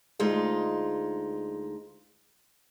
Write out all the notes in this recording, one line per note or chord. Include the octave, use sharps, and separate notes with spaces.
D2 G#3 D#4 F4